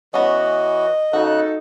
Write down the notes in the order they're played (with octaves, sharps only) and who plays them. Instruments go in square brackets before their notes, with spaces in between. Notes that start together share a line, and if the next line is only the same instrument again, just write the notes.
[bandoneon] E3 F#4 [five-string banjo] B3 C#4 [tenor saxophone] D#5
[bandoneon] C#3 F#6 [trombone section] D#4 A4 [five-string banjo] F#4